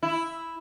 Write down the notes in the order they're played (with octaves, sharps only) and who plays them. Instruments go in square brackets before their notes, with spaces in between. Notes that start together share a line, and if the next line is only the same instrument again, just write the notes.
[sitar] E4